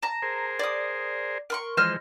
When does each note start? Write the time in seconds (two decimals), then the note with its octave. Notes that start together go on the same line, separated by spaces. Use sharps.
0.03 A5 A#5
0.22 G#4 A#4 C5
0.59 D5 D#6
1.50 A#4 C6 C#6
1.77 E3 F3 G#3 C5 D#5 F6